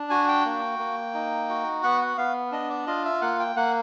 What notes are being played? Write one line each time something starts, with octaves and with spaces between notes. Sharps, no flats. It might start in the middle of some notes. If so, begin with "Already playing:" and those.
Already playing: D4
F#4 G#5
G5
A#3
A#3
D#4
F#4
B3 F#5
F#5
B3 F5
D4 D#5
D5
F4 D#5
E5
A#3 F#5
G5
A#3 F#5